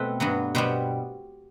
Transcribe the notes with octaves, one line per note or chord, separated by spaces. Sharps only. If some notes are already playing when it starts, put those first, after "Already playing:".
Already playing: B2 A3 C4 B4
G2 F#3 B3
B2 G3 B3 C5